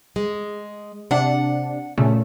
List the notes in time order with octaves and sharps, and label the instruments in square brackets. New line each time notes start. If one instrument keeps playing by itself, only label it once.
[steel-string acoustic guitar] G#3
[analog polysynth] C3 D4 [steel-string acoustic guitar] F#5
[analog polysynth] A#2 C#3 A3